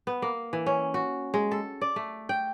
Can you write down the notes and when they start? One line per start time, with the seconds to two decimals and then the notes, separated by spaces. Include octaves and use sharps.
0.07 B3
0.22 A#3
0.53 E3
0.66 C#4
0.94 F#4
1.34 G#3
1.51 A4
1.81 D5
1.96 A3
2.29 G5